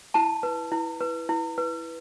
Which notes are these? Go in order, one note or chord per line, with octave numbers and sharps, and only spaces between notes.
E4 A5
B4
E4
B4
E4
B4